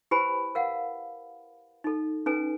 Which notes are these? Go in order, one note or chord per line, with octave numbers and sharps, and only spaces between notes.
E4 G4 B4 C5 G#5 B5
A#4 F5 F#5
D#4 A4
C#4 D#4 A4 B4 G#5